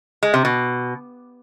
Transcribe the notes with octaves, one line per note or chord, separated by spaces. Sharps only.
G#3
C3
B2